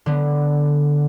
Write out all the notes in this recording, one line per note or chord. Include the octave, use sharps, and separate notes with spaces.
D3 B3